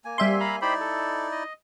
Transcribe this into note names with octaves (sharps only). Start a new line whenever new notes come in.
A#3 G#5
G3 C4 E5 C6
F5 A#5 B5
D#4 E4 G4 C5 D5 B5
A4
D#5